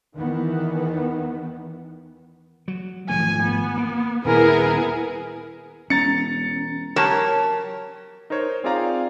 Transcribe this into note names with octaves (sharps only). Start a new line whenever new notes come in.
E2 D#3 E3 B3
F#3
G#1 F3 A3 G#5
B3
A#3
D#1 B3 E4 G#4 A#4
E1 C#4 A#5 A6 C#7
F#3 G4 A#4 C#5 A5
D#4 A#4 C5 C#5
C4 F4 G#4 D5 F5 A#5